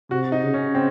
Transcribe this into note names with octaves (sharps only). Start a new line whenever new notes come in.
C3 F#4
D#4
C#3
C#4
C4